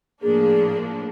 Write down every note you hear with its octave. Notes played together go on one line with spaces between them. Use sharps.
A2 F3 A#3 D4 G#4